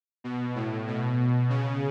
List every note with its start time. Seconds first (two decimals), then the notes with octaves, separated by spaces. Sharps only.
0.24 B2
0.55 A2
0.87 B2
1.49 C#3